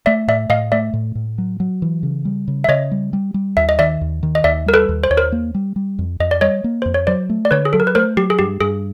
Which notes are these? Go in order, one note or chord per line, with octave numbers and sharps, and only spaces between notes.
A3 D5 E5
A2 D5 E5
A2 D#5 F5
A3 D5 E5
A2
A2
F#3
F#3
E3
C#3
G3
C#3
E5
C#3 C#5 D#5
G3
G3
G3
D#2 E5
D#5
D#3 D5 E5
D#2
D#3
D#5
D#2 D5 E5
G3 A#4
A4 B4
D#2
C5
D#2 C#5
A#4 C5
A#3
G3
G3
F2
F2 D#5
D5
G3 C#5 D#5
A#3
F2 C5
C#5
F#3 C5 D5
A3
D5
D3 B4 C#5
G#4
F#3 A4
A#4
B4
A3 A#4 C5
F#3 G4
G#4
G2 G4
G2 G#4